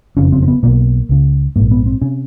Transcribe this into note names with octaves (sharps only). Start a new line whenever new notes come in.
F#1 F2 C#3 C#4
C4
C4
B3
B1 B2 A#3
C#2 C#3
A#1 G#2 A#3
B3
C4
C3 C#4